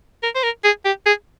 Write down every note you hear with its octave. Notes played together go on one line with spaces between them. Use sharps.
A#4
C5
A#4
G#4
G4
G#4